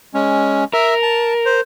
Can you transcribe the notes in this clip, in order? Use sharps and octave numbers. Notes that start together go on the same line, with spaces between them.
G#3 C#4
A#4 E5
A5
C5